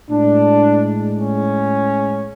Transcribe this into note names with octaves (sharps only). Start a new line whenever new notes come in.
A2 G#3 D4
C#4